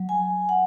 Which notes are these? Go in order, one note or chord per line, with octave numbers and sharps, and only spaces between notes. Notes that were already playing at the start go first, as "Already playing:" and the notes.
Already playing: F#3
G#5
F#5